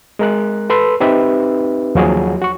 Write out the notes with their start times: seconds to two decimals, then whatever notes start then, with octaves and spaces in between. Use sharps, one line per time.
0.19 G#3 A#4 F#6
0.70 A4 B4 C6 E6
1.00 C4 D#4 G4 B4 E5
1.95 D#2 F3 F#3 F#4 G#4
2.42 F#4 C#6